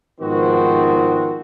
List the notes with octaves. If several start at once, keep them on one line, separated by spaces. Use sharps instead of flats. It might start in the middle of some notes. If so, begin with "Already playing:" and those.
G#2 D#3 F3 B3 C4 F#4